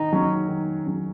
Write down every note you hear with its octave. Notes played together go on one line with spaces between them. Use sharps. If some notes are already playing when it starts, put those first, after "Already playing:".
Already playing: D#3 D#4
F#3 C#4
D#3
F#3 C#4